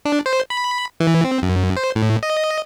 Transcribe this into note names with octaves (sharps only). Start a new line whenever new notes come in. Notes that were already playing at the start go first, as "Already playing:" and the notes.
D4
C5
B5
E3
C4
F#2
C5
A2
D#5